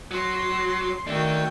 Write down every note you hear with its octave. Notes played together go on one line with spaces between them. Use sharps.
F#3 C6
D#3 A3 D4 F#4 G5